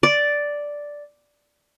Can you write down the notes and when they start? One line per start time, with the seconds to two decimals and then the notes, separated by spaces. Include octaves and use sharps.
0.03 D5